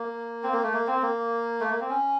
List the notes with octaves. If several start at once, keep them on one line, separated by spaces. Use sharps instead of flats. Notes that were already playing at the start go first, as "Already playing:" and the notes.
Already playing: A#3
C4
A#3
A3
A#3
C4
A#3
A3
A#3
C4
C#4